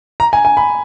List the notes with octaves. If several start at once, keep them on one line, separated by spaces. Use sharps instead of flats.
A#5
G#5
G#5
B5